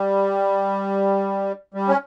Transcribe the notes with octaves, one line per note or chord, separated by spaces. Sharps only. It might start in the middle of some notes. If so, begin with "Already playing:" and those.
Already playing: G3
G3
C#4